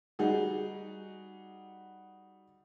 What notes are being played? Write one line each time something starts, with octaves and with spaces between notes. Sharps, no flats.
G3 D#4 F#4 G#4